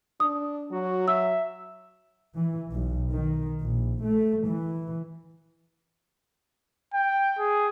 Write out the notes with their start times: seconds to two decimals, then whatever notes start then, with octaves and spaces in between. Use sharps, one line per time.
0.20 D4 D#6
0.71 F#3 F#4
1.08 E5 E6
2.36 E3
2.70 B1
3.12 D#3
3.61 A#1
4.05 A3
4.47 E3
6.94 G5
7.39 G#4